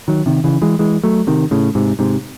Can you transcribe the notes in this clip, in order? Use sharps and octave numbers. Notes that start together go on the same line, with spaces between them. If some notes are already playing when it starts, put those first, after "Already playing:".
D#3 F#3
C3 D#3
C#3 E3
E3 G#3
E3 G#3
F#3 A3
C3 D#3
A2 C#3
G#2 C3
G#2 C3